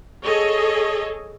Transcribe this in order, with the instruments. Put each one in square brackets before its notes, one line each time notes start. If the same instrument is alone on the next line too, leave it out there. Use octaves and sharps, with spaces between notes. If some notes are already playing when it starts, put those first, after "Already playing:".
[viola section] G#4 A4 C#5 D#5